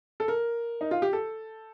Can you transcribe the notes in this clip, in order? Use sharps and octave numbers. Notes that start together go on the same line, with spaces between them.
A4
A#4
D#4
F4
G4
A4